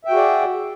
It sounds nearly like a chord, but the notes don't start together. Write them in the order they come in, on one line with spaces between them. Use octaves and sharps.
E5 G5 F#4 G#4 D5